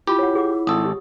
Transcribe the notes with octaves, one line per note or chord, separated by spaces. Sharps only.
E4 F4 G4 B5
C#5 F#5
G#4 F#5 D6
G#1 A4 D#6
G4